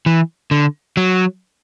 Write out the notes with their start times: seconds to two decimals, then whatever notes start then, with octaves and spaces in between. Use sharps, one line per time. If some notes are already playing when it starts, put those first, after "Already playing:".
0.06 E3
0.51 D3
0.97 F#3